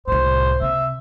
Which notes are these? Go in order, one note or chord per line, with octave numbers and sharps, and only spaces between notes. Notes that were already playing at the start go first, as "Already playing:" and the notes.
C2 A2 C5
C3 E5